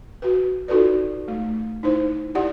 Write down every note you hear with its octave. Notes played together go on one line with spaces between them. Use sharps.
F#4 B4
D#4 F4 F#4 A4 B4 D5
A3
D#4 E4 C5
E4 G4 D5 F#5